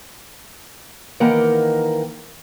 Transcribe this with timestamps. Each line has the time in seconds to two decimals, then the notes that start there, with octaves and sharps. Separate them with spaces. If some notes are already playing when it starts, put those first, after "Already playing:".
1.20 D#3 E3 A#3 A#4 F#5 G5